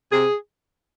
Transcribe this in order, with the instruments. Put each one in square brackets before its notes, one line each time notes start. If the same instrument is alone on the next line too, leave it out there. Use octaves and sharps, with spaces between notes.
[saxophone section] C3 G#4